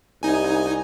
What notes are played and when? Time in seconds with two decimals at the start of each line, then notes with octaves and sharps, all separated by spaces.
0.23 C2 D#4 G#5